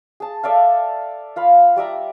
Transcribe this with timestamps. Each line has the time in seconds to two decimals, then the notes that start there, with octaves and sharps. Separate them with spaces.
0.20 G#4 A5
0.43 A4 D5 E5 F5
1.36 F4 F5 B5
1.76 G3 D5 E5 A#5